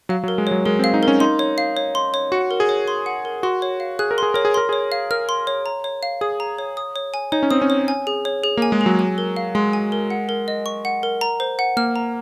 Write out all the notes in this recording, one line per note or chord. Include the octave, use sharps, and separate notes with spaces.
F#3 F5
F#3
A#4
G#3
F#3 C#5
G#3 A#4
C4
F5
D#4
A#4
C#4
D#4 C6
C#5
F5
C#5
C6
C#5
F#4 F#5
A#4
G#4
C#5
C6
F#5
A#4
F#4 C6
C#5
F5
G#4 F#6
A#4
G#4 C6
A#4 C#5
G#4
A#4 C6
G#4 C#5
F5
A#4 F6
C6
C#5
A#5
C#5
F5
G#4 D#6
A#5
C#5
D#6
C#5
G#5
D#4 C#5
C#4
C4 D#6
C#4
C#5
G#5
G#4
C#5
G#4
A#3
G#5
G#3
G#4
F#3
G#5
A#4
F5
G#3 C6
G#5
A#4
F#5
A#4
D#5
C#6
F#5
A#4
A#5
C5
F#5
A#3 F6
A#5